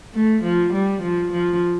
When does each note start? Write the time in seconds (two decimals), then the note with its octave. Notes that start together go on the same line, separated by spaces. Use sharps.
0.14 A3
0.43 F3
0.73 G3
1.02 F3
1.32 F3